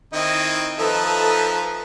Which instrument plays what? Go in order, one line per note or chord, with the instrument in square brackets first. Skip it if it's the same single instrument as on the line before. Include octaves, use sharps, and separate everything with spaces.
[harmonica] D#3 C4 E4 [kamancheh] D#5
[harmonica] F3 D#4 E5 [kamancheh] A4 B4